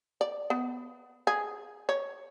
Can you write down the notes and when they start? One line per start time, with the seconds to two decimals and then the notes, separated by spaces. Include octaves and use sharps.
0.21 D5
0.50 B3
1.27 G#4
1.89 C#5